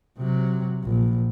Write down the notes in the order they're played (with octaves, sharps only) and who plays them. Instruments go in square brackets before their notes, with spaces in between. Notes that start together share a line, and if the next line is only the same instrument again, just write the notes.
[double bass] C3 F#3
A#1